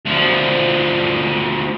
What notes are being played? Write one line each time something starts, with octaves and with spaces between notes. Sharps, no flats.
D2 F3